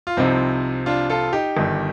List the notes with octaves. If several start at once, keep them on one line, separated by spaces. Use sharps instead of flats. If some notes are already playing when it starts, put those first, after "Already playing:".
F4
C2 C3 F3 C4 D#4
D4 F4
F4 A4
D#4 G4
G1 G2 D#3